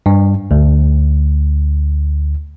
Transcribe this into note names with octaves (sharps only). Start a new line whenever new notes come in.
G2
D2